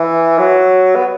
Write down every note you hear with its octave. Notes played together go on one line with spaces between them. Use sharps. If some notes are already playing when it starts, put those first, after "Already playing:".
Already playing: E3
F#3
B3